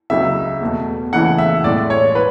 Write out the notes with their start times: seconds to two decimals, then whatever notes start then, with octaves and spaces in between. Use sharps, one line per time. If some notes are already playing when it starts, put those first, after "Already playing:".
0.10 C#2 C#3 F#3 E5
0.61 E2 B2 A3
1.13 C#2 C#3 E3 A3 F#5
1.38 E5
1.64 A2 G#3 D5
1.90 C#5
2.15 B4